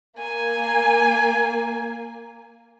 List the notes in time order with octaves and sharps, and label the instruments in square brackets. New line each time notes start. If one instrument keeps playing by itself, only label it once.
[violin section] A#3 [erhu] G#5